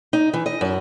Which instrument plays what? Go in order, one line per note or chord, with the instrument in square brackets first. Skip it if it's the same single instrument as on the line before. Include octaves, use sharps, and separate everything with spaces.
[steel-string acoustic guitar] D#4
E3
D#5
F#2